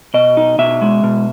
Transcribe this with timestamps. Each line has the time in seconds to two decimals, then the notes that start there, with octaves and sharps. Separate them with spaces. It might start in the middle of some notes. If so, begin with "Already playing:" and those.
0.14 B2 D#5
0.37 D#4
0.59 B2 E5
0.82 G#3
1.04 B2